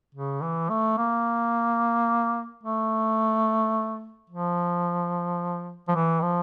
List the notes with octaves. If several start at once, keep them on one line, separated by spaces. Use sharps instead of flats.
C#3
E3
A3
A#3
A3
F3
F3
E3
F3